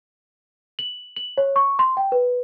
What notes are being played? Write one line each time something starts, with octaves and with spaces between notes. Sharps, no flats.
F#7
F#7
C#5
C#6
C6
G5
B4